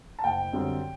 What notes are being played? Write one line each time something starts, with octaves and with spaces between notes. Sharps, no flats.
A5
F#1 G5
F#2 D3 G3 C4